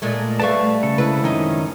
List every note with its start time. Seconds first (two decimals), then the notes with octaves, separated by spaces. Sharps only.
0.02 A#2 G#3 A3
0.40 G3 A3 B4 E5 F5 A5 C#6
0.83 C#3 A4
0.98 C3 G#3 E4 B4
1.24 F#2 D#3 C#4 D#4 D#5